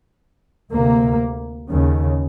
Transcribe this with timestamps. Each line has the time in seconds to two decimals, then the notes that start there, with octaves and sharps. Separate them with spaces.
0.70 D2 C3 A#3
1.70 D#2 C#3